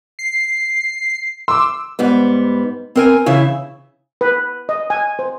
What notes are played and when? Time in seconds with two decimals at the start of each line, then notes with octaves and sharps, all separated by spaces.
0.19 C7
1.48 C6 D6 E6
1.99 G#2 G3 B3
2.96 C4 A#4 G#5
3.26 C#3 E3 E4
4.21 B4
4.69 D#5
4.90 G#5
5.19 C5